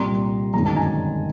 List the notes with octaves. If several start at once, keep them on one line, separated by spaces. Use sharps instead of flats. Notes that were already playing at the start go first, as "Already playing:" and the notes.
Already playing: C2 A#2 G3 C4 A#5 C6
G1 F#2 D#3 G#3 C4 A#5
A5
G#5 A#5